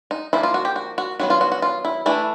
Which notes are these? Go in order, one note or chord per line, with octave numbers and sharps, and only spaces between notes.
D#4
F3 A#3 D#4 E4
F4
F#4
G4
F#4
F#4
D#3 F#3 B3 F#4
F4
F#4
F#4
F4
E4
E3 A3 D4 E4